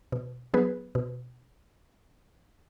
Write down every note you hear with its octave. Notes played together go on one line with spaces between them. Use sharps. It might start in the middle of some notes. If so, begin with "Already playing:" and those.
B2
F#3 B3 G#4 B4
B2